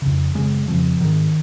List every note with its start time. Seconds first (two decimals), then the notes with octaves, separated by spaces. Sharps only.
0.02 F2 C#3
0.35 F#2 C#3 G#3
0.68 F2 C#3 F3
1.00 G#2 D#3